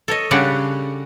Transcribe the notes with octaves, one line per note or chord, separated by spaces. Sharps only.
A4 C#5 D#5
C#3 G3 D4 G4 C#5 F#5